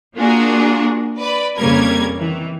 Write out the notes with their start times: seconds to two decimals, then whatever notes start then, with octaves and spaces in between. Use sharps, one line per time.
0.16 A#3 D4 F4 F#4 G#4 A#4
1.18 B4 D5 B5
1.57 F2 C#3 G3 A#3 A#4 G#6
2.19 D#3 E3